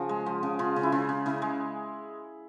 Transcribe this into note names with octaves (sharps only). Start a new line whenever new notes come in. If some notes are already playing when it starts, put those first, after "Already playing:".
Already playing: C#3 F3 F#4
G#3
F3
C#3
C#3 F4
C#3
E4
C#3 F4
C#3
C#3 E4
G#3